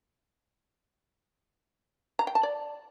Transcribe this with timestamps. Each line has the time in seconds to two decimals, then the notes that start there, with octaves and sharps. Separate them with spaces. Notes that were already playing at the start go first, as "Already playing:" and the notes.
2.19 A#5
2.27 G5
2.35 A5
2.43 D5